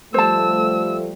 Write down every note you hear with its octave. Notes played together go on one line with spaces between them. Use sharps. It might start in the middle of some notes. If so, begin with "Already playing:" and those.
F3 G3 A3 C5 A5 E6